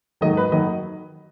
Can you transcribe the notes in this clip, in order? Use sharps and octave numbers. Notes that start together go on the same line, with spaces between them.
G#2 D#3 F#3 D#5
B4
D#3 F#3 D#5